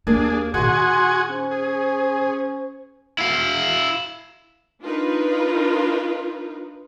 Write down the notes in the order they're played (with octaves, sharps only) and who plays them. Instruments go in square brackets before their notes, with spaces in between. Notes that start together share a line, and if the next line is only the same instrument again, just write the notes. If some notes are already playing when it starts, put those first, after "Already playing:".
[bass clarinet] D#2 [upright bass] A#3 E4 [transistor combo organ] D4 G#4 [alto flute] A#4
[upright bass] A#2 D#3 [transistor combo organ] F#4 G#5 [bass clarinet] G#4 [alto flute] C6
[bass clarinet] C#4 [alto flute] C5
[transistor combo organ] G#4
[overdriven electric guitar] E4 F5
[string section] D4 D#4 F4 A#4 B4